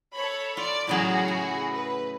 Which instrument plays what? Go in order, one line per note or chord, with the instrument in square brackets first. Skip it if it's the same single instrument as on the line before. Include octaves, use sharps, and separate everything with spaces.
[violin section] A4 C#5 B5
[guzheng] F4 [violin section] D5
[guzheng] A2 C#3 F#3 [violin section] F#4 G#4
[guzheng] E4
[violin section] B4